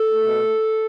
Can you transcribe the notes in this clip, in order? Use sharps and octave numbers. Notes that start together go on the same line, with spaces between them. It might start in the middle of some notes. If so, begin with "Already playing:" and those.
Already playing: A4
A3
B2